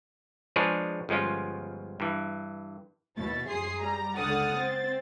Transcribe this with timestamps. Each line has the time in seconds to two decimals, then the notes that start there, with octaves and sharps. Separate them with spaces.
0.56 F3 G#3 D4 G#4 B4 C#5
1.09 G1 F3 G#3 C#4 F4
2.00 G2 E3
3.17 D#2 B2 E4 A6
3.48 F#2 G#4 C6 D#6 C7
3.79 G3 A#5
4.16 C#2 D3 F#5 D#6 F6 A6
4.55 C4 A6